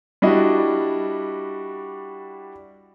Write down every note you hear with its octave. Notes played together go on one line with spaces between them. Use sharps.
G3 D4 E4 F#4 D#5